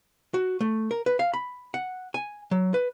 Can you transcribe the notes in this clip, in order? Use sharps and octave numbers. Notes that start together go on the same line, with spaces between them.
F#4
A3
A#4
B4
F5
B5
F#5
G#5
F#3
B4